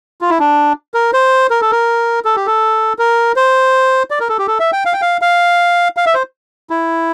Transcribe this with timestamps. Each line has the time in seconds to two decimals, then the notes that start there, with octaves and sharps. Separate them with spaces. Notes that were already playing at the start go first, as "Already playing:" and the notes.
0.21 F4
0.30 E4
0.39 D4
0.94 A#4
1.13 C5
1.50 A#4
1.61 A4
1.71 A#4
2.25 A4
2.36 G4
2.46 A4
2.99 A#4
3.36 C5
4.10 D5
4.20 A#4
4.29 A4
4.38 G4
4.47 A4
4.60 E5
4.73 G5
4.85 F5
4.93 G5
5.01 F5
5.21 F5
5.97 F5
6.06 E5
6.14 C5
6.70 E4